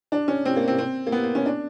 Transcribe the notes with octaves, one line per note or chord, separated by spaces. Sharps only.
D4
C#4
C4
A#3
C4
C4
A#3
B3
A#3
C#4
D4